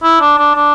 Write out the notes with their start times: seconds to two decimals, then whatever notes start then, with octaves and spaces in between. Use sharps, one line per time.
0.03 E4
0.20 D4
0.38 D4
0.55 D4